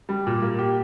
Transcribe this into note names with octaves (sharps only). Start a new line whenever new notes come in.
G3
A#2
A#3
G4